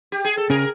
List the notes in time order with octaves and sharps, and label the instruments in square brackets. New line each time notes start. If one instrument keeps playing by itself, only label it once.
[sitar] G4
G#4
A4
[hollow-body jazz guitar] C#3 C#4 [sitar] G#4 A#4